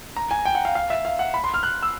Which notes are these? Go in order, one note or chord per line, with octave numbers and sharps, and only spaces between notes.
A#5
G#5
G5
F#5
F5
F5
E5
F5
F#5
B5
C6
F6
F#6
E6